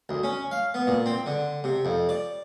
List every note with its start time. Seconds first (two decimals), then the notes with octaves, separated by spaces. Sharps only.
0.09 D2
0.23 C#4
0.51 F5
0.74 B3
0.87 A#2
1.06 C4
1.26 D3
1.64 C3
1.85 F2
2.09 D5